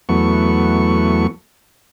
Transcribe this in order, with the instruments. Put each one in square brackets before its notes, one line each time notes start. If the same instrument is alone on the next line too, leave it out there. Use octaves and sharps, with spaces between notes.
[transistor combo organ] E2 F#3 A3 B3 C#6